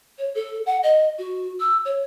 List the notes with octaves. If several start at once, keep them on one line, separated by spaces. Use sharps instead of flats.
C#5
A4
F#5
D#5
F#4
E6
C#5